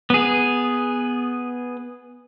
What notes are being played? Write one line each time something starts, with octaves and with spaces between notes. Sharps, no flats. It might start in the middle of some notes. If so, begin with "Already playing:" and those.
B3 G#4